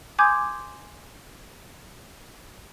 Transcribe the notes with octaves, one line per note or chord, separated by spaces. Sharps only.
G#5 C6 D6 D#6 G6 G#6